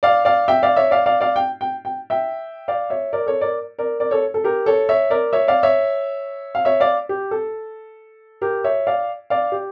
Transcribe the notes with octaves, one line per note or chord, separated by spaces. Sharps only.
D5 F5
D5 F5
E5 G5
D5 F5
C#5 E5
D5 F5
D5 F5
D5 F5
G5
G5
G5
E5 G5
D5 F5
C#5 E5
A#4 D5
A4 C#5
A#4 D5
A#4 D5
A#4 D5
A4 C#5
A4
G4 A#4
A4 C#5
C#5 E5
A#4 D5
C#5 E5
D5 F5
C#5 E5
F5
C#5 E5
D5 F5
G4
A4
G4 A#4
C#5 E5
D5 F5
D5 F5
G4